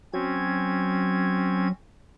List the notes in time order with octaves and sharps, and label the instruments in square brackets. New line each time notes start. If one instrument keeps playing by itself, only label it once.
[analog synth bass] F#3 [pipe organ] C4 C#4 G#6